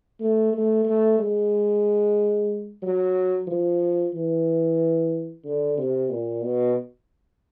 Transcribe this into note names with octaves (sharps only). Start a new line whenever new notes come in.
A3
A3
A3
G#3
F#3
F3
E3
D3
C3
A#2
B2